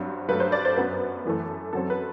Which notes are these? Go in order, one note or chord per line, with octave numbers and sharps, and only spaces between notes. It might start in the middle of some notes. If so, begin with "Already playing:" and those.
Already playing: G2 F#3 C4
G2 F#3 A3 B4
C5
D5
C5
F#2 F#3 B3 B4
F#2 E3 A3
F#2 F#3 C4 A4
B4